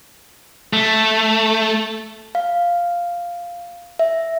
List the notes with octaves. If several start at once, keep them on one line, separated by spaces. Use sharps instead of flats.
A3
F5
E5